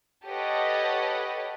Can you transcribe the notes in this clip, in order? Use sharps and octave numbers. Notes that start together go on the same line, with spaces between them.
G4 A4 B4 C#5 D#5 F#5